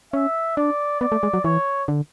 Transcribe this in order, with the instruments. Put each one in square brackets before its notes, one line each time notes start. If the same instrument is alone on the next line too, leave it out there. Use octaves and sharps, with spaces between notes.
[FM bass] C#4 [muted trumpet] E5
[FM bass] D4 [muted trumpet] D5
[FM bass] B3 [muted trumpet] D5
[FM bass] A3
G#3
F#3
[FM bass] E3 [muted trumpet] C#5
[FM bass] D3